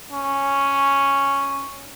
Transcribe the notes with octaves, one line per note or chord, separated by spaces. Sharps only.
C#4